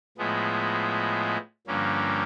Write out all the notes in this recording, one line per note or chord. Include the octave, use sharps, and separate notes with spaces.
A2 F3 G#3 B3
G2 D3 F3 A#3 C#4